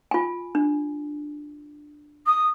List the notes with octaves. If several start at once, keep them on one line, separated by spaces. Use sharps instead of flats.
F4 G#5
D4
D#6